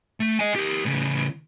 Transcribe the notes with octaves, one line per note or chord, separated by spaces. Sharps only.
A3
D#5 G#5
G4 A#4
A2 C#3